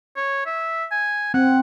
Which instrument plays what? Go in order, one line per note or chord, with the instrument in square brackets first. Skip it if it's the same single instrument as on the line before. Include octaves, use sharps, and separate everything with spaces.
[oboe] C#5
E5
G#5
[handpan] C4 [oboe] F#5